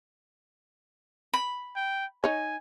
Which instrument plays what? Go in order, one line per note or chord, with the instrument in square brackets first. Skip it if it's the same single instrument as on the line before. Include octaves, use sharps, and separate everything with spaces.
[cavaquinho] B5
[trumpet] G5
[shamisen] D#4 C#5 [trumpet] G#5